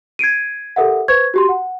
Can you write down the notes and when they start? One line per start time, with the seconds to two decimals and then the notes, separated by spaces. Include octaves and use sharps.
0.19 G#6 C7 D7 D#7
0.76 G4 A4 A#4 E5 F#5
1.08 B4 C5 C#6 G#6
1.34 F#4 G4 C6
1.49 F#5